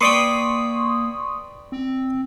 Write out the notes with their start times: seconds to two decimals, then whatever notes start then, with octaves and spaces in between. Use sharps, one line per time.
0.01 A#3 B4 D5 G5 C6 C#6 D#6
1.72 C4